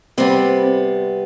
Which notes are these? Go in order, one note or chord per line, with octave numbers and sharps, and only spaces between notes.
C3 G3 B3 C4